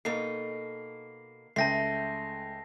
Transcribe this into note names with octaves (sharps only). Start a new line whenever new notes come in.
B2 A#3 D#4 A4 C7
C#2 A3 G5 A5 A#6 C7